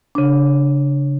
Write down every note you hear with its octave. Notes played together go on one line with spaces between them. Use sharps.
C#3 D4